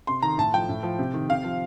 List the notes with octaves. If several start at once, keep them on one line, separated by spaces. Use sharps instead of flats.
C3 C6
D#3 A#5
A2 A5
F3 G5
A2
F3
C3
D#3
C3 F5
F3